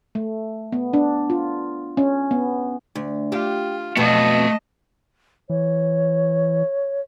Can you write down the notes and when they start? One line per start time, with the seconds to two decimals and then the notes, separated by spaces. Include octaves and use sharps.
0.15 A3
0.72 B3
0.93 D4
1.30 F4
1.97 C#4
2.31 B3
2.95 D2
3.32 F4 G4
3.97 F2 B2 F#3 A3 D#5 F5 A5
5.50 E3 C#5